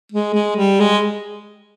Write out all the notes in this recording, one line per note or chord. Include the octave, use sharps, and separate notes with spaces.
G#3
G#3
G3
G#3